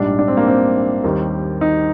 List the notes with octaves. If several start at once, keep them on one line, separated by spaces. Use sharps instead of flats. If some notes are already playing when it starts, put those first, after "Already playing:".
Already playing: A#1 G#2 G3 D4
D4
C4
A#3
C4
D#2 D#3 G3
D#4